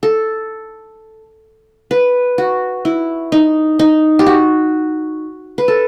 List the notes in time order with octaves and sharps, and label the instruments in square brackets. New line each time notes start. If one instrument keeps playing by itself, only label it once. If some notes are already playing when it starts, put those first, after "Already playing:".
[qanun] A4
B4
F#4
E4
D#4
D#4
G4
F#4
B4
A4